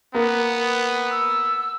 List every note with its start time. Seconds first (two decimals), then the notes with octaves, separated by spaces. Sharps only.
0.14 A#3 B3
1.11 E6